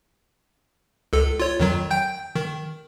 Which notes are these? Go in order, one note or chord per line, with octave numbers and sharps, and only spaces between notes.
C#2 A4
F4 C#5
F2 D#3 F#3
G5 G6
D#3